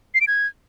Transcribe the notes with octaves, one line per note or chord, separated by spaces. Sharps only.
C7
D7
G#6